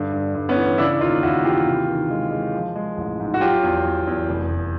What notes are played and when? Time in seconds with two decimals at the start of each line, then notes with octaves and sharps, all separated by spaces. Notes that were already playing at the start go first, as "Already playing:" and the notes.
Already playing: G2 D3
0.12 G2
0.35 G2
0.49 B3 C#4
0.56 E3
0.78 C#3 D4 E4
1.00 D#2 D#4 F4
1.22 D#2 E4 F#4
1.44 E3 F4 G4
1.66 C3
1.88 D#3
2.10 G#3
2.31 G#3
2.54 F3
2.75 G#3
2.97 A1
3.20 G#2
3.34 F#4
3.41 F#3 F4 G4
3.63 E2
3.85 E2
4.07 E2
4.29 F1
4.50 F1